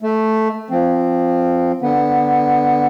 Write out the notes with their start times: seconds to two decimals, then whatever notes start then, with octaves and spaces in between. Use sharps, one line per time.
0.02 A3
0.70 F3 C4
1.82 D3 B3